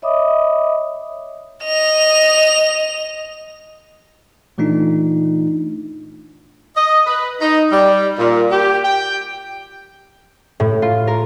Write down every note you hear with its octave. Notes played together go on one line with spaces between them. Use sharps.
C#5 D#5 E5 B5 D6 D#6
D#5 F7
A#2 E3 A3 D4 D#4 F4
D#5
B4
D#4
G3
A#2
G4
G5
A2
F4
A#4